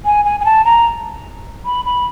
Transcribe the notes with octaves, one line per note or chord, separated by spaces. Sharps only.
G#5
G#5
G#5
A5
A#5
B5
B5